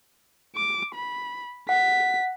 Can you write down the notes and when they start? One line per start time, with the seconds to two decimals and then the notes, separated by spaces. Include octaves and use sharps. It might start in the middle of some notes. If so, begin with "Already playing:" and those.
0.56 D6
0.95 B5
1.69 F#5 B6